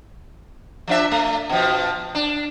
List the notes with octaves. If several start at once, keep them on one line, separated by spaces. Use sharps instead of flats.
F3 D4 E5
A3
B2 F3
D4